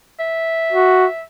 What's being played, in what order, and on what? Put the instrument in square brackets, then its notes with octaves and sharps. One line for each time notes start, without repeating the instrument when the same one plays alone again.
[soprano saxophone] E5
[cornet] F#4